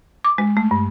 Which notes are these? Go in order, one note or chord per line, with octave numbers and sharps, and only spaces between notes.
D6
G#3
A3
G2